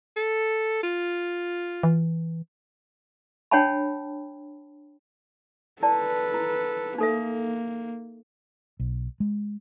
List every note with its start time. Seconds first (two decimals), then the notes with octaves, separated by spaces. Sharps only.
0.17 A4
0.83 F4
1.83 E3
3.51 D4 C#5 F#5 G5 A5 B5
5.82 E4 A4 B4 D5 A5
6.34 E4
6.98 A#3 D#4 A4 E5
8.79 B1
9.20 G#3